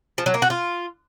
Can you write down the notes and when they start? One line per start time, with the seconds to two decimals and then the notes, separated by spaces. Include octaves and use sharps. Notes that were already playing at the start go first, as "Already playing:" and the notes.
0.18 F3
0.26 F#3
0.34 A#3
0.42 F#4
0.50 F4